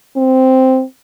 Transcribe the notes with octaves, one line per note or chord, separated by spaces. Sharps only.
C4